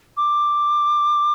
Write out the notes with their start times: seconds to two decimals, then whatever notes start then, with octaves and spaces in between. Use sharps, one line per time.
0.17 D6